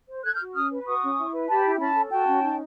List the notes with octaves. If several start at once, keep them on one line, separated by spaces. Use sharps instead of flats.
C5
A4 F#6 G#6
F6 G6
F#4
C#4 D#6 F6
B4
F#4 C#6 D#6
C#4
E4
B4
G4 A5 B5
E4
C#4 A5 B5
A4
F#4 G5 A5
C#4
D#4